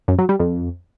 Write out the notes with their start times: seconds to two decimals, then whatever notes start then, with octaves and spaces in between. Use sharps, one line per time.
0.08 F#2
0.19 F#3
0.29 G3
0.39 F2